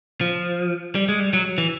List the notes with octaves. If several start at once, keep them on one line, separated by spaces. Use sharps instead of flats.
F3
G3
G#3
G3
F#3
E3